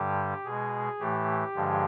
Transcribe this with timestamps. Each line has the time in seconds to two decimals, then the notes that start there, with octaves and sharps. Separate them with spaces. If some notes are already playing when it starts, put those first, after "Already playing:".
Already playing: G2 D3 G3 G4
0.44 B2 G#3 G#4
1.00 A2 E3 A3 G4
1.55 G2 D3 F3 G#3